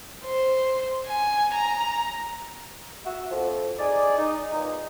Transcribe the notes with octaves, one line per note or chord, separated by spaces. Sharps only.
C5
G#5
A#5
F#4 E5
F2
D#4 G#4 D5
D#4
E2 A#2 D#4